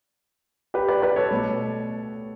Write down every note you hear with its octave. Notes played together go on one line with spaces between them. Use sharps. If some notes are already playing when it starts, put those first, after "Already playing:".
G4 B4
B4 D5
B4 D5
A4 C#5
B2 A3